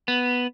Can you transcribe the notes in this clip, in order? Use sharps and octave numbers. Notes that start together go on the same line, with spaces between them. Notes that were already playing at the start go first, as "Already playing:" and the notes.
B3